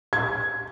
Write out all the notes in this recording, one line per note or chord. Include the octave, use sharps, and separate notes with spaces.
G#6